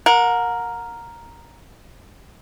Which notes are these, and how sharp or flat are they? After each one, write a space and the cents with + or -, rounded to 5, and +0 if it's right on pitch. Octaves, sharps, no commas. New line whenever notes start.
A#4 +0 F#5 -35